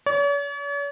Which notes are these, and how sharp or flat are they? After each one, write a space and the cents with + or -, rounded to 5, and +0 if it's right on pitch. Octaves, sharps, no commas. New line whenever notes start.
C#5 +45